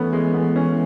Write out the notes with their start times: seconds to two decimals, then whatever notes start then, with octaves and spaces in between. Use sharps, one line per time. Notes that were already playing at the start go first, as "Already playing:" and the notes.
Already playing: E3 A3 B3 C#4
0.13 G#3
0.34 B3
0.56 C#4